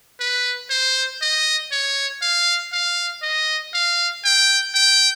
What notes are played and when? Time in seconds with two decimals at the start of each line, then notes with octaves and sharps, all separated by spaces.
0.20 B4
0.70 C5
1.21 D#5
1.72 C#5
2.22 F5
2.72 F5
3.22 D#5
3.73 F5
4.24 G5
4.74 G5